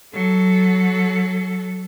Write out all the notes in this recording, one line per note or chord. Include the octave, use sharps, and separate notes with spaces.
F#3 A4